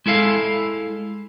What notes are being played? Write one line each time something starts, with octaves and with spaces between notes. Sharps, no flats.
G#3 E4 A4 F5